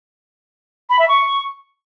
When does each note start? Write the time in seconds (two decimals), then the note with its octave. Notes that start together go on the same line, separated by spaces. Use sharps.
0.90 B5
0.99 E5
1.08 C#6